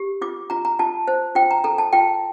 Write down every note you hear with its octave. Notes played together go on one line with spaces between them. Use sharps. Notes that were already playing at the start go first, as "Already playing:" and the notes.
Already playing: G4
F4 D6
F4 A#5
A#5
F4 A5
C5
F4 G5
A#5
A4 A#5
A5
F4 G5